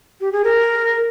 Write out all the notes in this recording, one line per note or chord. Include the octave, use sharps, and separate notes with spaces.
G4
G#4
A#4